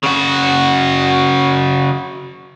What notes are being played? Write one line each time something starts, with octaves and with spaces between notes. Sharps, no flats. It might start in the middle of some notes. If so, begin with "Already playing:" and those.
C#3 F#4